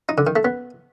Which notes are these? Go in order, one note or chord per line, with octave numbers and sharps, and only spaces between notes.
D#4
D3
D#3
A3
B3